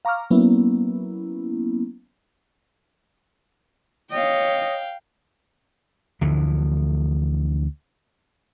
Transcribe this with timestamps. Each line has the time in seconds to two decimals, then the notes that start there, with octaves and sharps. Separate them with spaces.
0.05 F5 A#5 C#6 D6 F6
0.30 F#3 A#3 B3 C#4 E4
4.11 C#5 D#5 F5 G5
6.21 D2 D3 E3 F3